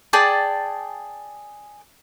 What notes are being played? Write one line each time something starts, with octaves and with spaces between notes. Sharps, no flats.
G#4 D5 G5 A5